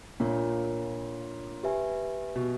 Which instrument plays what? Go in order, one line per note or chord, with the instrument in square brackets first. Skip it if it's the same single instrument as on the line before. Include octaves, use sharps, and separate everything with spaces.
[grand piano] A#2 [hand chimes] A#3 D4 F4 A#4 C#5
[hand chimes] G4 B4 E5 G#5
[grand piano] B2